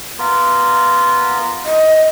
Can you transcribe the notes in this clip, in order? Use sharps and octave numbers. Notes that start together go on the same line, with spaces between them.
B3 F4 A#4
D#5